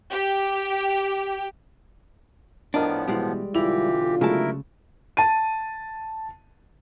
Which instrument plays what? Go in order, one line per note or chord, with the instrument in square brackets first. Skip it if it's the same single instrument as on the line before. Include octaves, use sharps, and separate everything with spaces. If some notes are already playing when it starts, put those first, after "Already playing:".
[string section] G4
[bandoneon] A2 F3 B3 [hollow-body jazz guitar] D4 [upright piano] A#4 D#5 A5
[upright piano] B2 E3 [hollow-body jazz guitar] G3 G#3
[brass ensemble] B1 D3 F4 [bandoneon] E3 G4 [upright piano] E4 F7
[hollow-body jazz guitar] C#3 A5 [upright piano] F#3 G#3 A3 [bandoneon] E4 A#4
[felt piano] A5 D#7